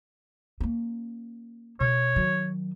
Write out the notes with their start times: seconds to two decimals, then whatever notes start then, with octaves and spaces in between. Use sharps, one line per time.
0.61 A#3 C#4
1.80 B2 C#5
2.16 D#3 F#3